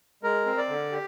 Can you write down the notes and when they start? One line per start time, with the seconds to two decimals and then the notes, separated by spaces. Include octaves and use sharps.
0.23 G#3 A#4
0.46 C4
0.58 D5
0.69 D3
0.92 G4